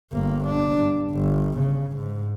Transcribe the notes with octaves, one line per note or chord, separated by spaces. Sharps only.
G1 A#3
D4
G2
G1
C#3
G#2